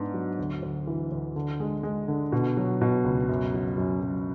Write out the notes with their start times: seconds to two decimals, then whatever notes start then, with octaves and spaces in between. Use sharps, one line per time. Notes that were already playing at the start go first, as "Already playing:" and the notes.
Already playing: G#2 B3 D4
0.14 F#3
0.39 D2
0.62 D2
0.87 E3
1.12 D2
1.36 D3
1.60 G#3
1.83 G#3
2.08 D3
2.32 B2
2.57 F#3
2.81 B2
3.05 C#2
3.29 F#2
3.54 F#3
3.78 F#2
4.02 F#2